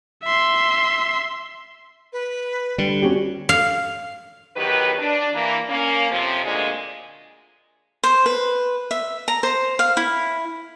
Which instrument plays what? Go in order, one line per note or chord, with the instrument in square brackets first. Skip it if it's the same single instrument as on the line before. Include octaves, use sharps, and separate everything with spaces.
[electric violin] E5 C6
[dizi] B4
[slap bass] D3 [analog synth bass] G3
[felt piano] C#4 F#4 G4
[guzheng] F5
[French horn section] E2 D#3 F#3 G4 B4
D4
E3 A#3
A#3 C#4
F2 C3 F3
D2 A#2 G#3
[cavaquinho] C5
B4
E5
A#5
C5
F5
E4